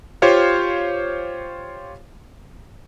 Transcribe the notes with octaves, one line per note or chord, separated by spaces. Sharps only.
F4 G4 C5 C#5 F5